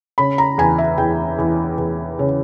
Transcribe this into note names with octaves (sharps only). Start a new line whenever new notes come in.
C#3 B5
A#5
E2 G#5
E5
E2 G5
E2
E2
C#3